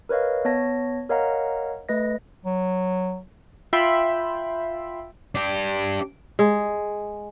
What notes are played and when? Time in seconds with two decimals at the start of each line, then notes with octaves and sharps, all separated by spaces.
0.09 A#4 B4 C#5 D#5 F5
0.45 B3 C#5 A5 A#6
1.09 A#4 C#5 D#5 F5 F#5 A#5
1.89 A3 B4 D#5 A#6
2.45 F#3
3.73 F4 E5 G5 B5 C6
5.35 D4 G4
6.39 G#3